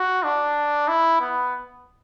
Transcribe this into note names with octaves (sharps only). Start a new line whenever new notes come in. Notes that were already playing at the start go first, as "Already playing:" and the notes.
Already playing: F#4
D4
E4
B3